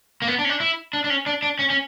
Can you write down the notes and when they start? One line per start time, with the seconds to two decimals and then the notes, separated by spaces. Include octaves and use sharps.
0.22 A#3
0.28 B3
0.39 D4
0.45 C#4
0.49 D4
0.60 E4
0.93 D4
1.04 D4
1.10 C#4
1.26 D4
1.43 D4
1.59 C#4
1.70 C#4